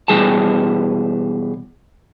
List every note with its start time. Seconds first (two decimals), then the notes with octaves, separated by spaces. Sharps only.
0.08 B2 E3 G3 G#4 G#5 A5